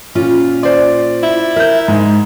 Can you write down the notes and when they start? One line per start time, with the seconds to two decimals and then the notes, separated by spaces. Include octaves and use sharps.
0.15 A#2 C#4 F4
0.63 C5 D5
1.23 E4
1.56 A#4 E5 G6
1.88 G#2 G#3